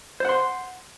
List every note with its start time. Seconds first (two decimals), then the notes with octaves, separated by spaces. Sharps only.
0.20 C5
0.25 F#5
0.29 C6